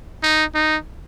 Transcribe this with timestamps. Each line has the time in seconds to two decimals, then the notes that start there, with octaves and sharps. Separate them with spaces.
0.23 D#4
0.55 D#4